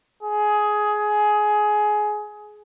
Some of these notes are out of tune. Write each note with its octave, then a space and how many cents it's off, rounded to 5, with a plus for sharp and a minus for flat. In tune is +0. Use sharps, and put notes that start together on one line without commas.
G#4 +15